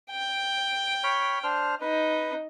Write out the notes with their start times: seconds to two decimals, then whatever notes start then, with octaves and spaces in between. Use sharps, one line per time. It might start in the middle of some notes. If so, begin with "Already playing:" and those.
0.11 G5
1.04 C#5 B5 F6
1.44 D4 C5 F6
1.81 D#4 B4